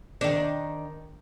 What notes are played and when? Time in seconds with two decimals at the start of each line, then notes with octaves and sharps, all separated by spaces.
0.21 D#3 D4